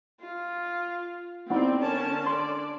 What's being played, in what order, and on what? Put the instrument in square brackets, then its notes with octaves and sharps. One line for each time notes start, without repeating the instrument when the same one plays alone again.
[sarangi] F4
[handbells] B3 D#4 E4 [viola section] C4 [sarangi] D5
[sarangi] D3 [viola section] C#4 A#4 A5
[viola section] D5 [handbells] C6